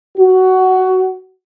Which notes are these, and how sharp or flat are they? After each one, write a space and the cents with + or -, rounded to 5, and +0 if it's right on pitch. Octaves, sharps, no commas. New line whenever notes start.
F#4 +15